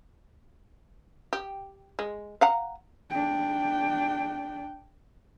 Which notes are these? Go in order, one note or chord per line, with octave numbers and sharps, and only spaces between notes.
G4
G#3
F5 F#5 A#5
D4 G5